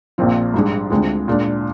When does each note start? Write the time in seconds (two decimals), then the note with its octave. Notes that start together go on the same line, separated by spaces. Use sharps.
0.18 A#1 A#2 F3 C4 F4
0.54 G#2 G3 D4 G#4
0.90 D2 D3 G#3 C4 F4
1.28 A#2 G#3 D4